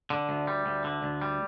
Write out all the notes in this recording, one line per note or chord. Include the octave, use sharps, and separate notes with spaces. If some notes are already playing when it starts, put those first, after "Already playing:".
D3
D2
G3
D2
D3
D2
G3